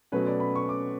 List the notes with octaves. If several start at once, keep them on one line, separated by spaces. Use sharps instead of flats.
B2 F#3 A3 C#4 B4
D5
B5
C#6
D6